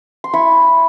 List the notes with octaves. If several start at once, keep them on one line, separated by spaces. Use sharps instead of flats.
C6
E4 B5 C#6